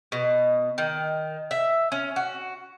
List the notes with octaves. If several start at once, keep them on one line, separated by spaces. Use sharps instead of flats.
B2
D#3
E5
C#4
F#4